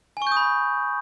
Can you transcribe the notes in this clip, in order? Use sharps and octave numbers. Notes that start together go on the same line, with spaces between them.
G#5 B5 C#6 D#6 G6